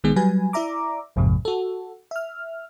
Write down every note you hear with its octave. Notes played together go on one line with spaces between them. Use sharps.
B1 D#3 G#3 B3 G#4
F#3 G3 B4 G#5
E4 D5 E5 A#5 D6
A1 F2 G#2 C3
F#4 A4
E5 F6